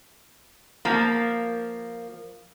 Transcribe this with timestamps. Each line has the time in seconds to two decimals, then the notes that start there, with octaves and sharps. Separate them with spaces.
0.85 F3 A#3